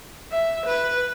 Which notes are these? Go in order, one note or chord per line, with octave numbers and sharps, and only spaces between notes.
E5
B4